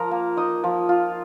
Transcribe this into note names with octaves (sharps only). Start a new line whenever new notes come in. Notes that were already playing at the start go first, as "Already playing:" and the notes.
Already playing: F3 A#4 A#5
A#3
D#4 D#5 D#6
F3
F4